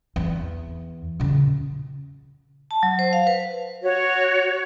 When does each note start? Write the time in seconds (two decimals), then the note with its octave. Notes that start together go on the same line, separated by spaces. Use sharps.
0.16 E2
1.20 A#2 C#3
2.71 A5
2.83 F#3
2.99 C5
3.13 F5
3.27 B4
3.82 F#4 C#5